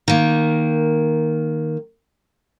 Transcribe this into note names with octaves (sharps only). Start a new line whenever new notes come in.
D#3 A#3